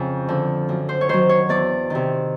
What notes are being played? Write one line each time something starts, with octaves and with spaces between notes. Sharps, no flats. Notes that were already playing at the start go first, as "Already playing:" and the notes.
Already playing: F2 C#3
D3 F3
F#2
C5
C#5
D#3 F#3 C5
C#5
E2 D5
C3 D#3